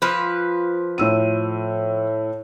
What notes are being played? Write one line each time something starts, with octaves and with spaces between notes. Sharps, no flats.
F3 B4
A2 E6 D#7